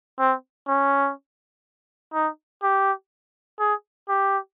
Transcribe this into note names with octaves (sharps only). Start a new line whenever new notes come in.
C4
C#4
D#4
G4
G#4
G4